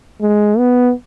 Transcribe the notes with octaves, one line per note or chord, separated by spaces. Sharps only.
G#3
B3